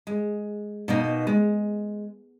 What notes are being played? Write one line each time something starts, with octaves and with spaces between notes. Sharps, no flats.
G#3
B2 A#3 D#4
G#3